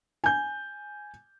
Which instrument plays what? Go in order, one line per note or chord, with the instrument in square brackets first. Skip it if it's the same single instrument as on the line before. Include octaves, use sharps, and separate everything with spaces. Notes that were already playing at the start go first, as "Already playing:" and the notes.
[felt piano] G#5 G6